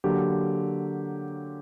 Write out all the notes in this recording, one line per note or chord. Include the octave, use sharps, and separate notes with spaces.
D3 F#3 A#3 G4